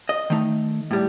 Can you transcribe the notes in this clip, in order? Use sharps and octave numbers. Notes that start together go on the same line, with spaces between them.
D#5
D#3 A3 D#4
A2 G3